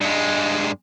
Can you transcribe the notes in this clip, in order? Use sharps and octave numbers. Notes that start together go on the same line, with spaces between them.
G2 G#3